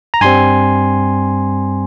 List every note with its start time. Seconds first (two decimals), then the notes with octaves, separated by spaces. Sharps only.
0.14 A#5
0.21 G2 G3 C4 G#5 C6